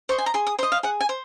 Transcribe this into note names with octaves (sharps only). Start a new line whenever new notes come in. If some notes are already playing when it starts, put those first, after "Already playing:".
C5 D#5 C#6
G#5
A#5
G#4 C6
D#6
C5 D#5 C6
F5
G#4 F#5
G#5
C5